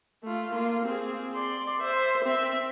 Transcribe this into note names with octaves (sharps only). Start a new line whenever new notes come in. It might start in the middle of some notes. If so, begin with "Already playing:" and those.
A3 F4
A#3 F4
C4 G#4
D5 C6
C5 E5
C4 E5